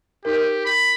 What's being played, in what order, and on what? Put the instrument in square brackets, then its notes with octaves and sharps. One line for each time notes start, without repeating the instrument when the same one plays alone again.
[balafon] D#4 A#4 [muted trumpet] G4
[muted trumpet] B5